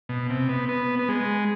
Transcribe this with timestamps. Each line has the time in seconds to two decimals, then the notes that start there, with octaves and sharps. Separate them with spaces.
0.09 B2
0.30 C3
0.49 B3
0.69 B3
0.99 B3
1.09 G#3